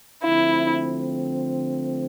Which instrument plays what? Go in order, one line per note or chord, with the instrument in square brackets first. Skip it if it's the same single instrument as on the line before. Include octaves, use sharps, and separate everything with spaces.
[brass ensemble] D3 F3 A3 C4 [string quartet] E4